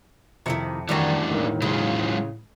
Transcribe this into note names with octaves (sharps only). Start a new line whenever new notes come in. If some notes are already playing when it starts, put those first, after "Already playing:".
F2 C3 D#3 E4 C#7
D#3 E3 G3 A3 C#4 D4 F#4
E1 A2 D#3 A#3
C#3 F#3 G#3 F4